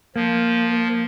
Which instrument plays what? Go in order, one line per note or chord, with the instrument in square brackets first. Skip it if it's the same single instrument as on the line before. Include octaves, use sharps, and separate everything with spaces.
[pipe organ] F3 [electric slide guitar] A#3